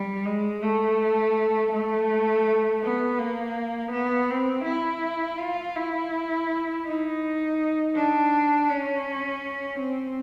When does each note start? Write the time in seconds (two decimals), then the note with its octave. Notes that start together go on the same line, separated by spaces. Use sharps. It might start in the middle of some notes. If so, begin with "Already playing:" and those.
Already playing: G3
0.26 G#3
0.62 A3
1.73 A3
2.83 B3
3.19 A#3
3.92 B3
4.30 C4
4.65 E4
5.38 F4
5.76 E4
6.86 D#4
7.95 D4
8.69 C#4
9.79 C4